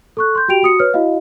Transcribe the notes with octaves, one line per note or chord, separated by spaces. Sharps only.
A4 C#6 F#6
C6 G6
F#4 G4 G5 D7 F7
F#4 D#6 C#7
B4 C#5 F6
E4 F#4 D#5 F5